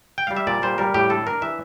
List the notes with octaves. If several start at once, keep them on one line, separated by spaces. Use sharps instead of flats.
G5
G3 F5
E5
A#2 D5
G3 C5
G3 A#4
A2 G4
D4 A4
D4 A#4
E3 E5